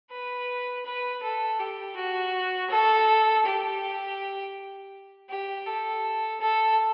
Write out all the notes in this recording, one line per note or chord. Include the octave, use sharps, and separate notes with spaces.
B4
B4
A4
G4
F#4
A4
G4
G4
A4
A4